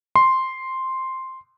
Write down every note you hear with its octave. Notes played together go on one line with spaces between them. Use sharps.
C6